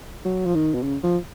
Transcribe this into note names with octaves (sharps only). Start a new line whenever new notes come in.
F#3
F3
D#3
B2
C#3
F3